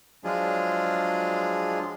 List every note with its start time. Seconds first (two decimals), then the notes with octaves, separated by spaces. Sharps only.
0.24 F3 F#3 G#3 D4 F4 G#4